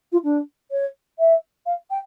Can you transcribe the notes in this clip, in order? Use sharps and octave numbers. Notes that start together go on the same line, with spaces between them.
F4
D4
C#5
E5
F5
G5